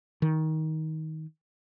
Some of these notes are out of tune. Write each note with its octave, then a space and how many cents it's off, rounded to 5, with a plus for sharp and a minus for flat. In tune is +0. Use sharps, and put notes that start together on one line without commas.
D#3 +20